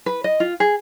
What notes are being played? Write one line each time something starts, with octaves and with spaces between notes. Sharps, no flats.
B4
D#5
F4
G#4